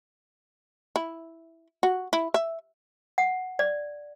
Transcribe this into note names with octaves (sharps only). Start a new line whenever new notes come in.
E4
F#4
E4
E5
F#5
D5